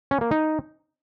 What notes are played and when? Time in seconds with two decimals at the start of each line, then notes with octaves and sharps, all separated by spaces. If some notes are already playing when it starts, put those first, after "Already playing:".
0.11 C#4
0.21 A#3
0.31 D#4